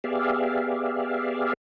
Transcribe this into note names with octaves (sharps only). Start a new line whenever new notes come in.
B3 G4 G#4 D5 E5 F5